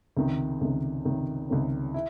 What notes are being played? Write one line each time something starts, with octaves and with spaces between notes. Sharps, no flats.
C#2 C3 D#3
C#2 C3 D#3
C#2 C3 D#3
C#2 C3 D#3
E4